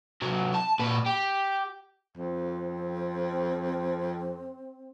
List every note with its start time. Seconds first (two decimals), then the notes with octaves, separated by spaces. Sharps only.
0.21 C3 F#3
0.54 A5
0.79 A#2 B4
1.06 G4
2.17 F2 C4